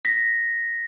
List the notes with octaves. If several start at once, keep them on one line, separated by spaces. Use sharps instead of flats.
A#6 B6